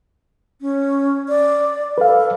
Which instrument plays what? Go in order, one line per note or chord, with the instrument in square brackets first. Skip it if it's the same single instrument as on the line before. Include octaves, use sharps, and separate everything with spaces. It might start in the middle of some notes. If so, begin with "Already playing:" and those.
[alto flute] C#4
D5
[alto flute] A4 [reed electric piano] B4 F5